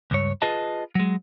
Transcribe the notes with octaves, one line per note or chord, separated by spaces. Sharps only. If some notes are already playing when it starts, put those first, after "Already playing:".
C#2 G2 C#5
F4 G#4 B4 D#5 A5
F#3 G#3